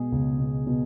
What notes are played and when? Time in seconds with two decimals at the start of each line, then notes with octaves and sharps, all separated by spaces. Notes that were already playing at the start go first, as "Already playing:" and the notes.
Already playing: B2 G#3 G#4
0.12 C#2
0.40 B2
0.67 B2